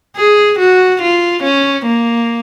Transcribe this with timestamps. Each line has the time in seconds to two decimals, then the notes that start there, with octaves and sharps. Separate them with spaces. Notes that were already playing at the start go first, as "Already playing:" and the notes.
0.17 G#4
0.59 F#4
1.02 F4
1.43 C#4
1.86 A#3